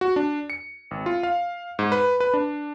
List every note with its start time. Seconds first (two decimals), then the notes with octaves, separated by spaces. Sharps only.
0.01 F#4
0.16 D4
0.50 C#7
0.91 G#1
1.06 F4
1.23 F5
1.79 G#2
1.92 B4
2.20 B4
2.34 D4